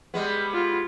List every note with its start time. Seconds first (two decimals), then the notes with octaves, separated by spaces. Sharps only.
0.14 G3 G#3 B3
0.53 F4